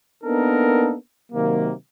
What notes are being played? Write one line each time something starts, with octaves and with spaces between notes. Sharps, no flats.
A#3 B3 D4 D#4 A4 A#4
C3 D#3 F#3 A#3